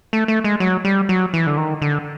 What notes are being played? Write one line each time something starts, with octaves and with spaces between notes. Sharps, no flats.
A3
A3
G#3
F#3
G3
F#3
E3
D3
D#3
D3